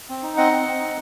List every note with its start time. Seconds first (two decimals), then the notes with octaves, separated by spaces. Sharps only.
0.09 C4
0.23 D#4
0.37 C4 D#5 F#5
0.52 C4
0.66 C4
0.80 D#4